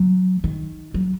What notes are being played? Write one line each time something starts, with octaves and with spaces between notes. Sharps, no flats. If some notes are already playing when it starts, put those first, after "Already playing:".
Already playing: F#3
D#3
F#3